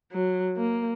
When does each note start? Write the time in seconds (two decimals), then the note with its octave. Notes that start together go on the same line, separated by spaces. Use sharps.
0.12 F#3
0.57 A#3